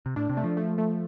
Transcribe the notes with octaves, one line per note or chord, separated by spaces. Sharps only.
C3
A2 D4
C3
A3
F3
A3
A3